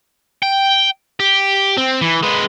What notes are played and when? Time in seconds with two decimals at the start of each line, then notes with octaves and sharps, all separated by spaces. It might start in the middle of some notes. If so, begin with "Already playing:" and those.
0.43 G5
1.20 G4
1.77 C4
2.01 E3
2.23 G#3 B4